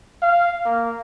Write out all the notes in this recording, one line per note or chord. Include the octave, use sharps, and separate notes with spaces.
F5
A#3